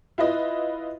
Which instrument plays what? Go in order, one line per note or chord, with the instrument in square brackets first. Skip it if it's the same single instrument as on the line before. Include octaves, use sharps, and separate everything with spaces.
[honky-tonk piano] E4 F4 B4 D#5